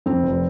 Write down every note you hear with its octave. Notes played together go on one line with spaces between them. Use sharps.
F2 C4
F1